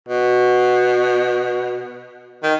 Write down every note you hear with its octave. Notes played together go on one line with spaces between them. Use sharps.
B2
D#3